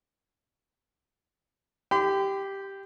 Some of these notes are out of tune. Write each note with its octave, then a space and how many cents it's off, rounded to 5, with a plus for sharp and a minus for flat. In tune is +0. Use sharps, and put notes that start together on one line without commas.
G4 +0 C6 -45